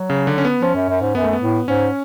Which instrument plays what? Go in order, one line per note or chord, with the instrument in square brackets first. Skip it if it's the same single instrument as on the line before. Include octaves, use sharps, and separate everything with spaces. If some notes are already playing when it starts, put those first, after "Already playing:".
Already playing: [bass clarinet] F#3
[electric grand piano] C#3
D3
C#4
B3
[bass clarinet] F3 [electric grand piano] C#4
[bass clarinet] F#2
F#2
G#2
[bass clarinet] F#2 [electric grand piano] B3
[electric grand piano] A3
B3
[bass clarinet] A2
[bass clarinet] G#2 [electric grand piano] C#4